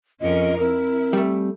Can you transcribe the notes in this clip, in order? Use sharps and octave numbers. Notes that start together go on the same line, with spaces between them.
F2 C#4 F4 A#4 D#5
C4 E4 A#4
G3 A3